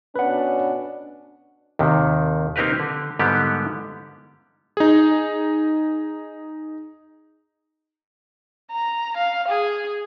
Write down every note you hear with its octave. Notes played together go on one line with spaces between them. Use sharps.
B2 C#4 D4 B4 F#5
D#2 C3 D#3
A#3 C4 D#4 G4 A#4 B4
D3
G#2 D3 G3 A#3 B3 G4
D#4 G#4
A#5
F5
G#4